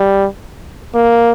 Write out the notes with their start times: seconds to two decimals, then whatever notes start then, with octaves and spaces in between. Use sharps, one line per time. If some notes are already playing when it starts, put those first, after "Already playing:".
Already playing: G3
0.95 A#3